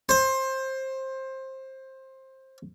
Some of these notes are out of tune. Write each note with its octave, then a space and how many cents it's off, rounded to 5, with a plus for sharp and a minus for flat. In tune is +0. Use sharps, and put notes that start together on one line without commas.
C5 +20